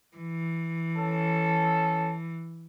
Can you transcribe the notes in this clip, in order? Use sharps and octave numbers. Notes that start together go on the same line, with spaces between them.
E3
C#4 A4